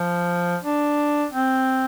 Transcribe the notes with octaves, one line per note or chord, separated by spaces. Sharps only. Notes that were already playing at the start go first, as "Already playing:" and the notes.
Already playing: F3
D4
C4